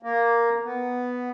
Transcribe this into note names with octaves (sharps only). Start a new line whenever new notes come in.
A#3
B3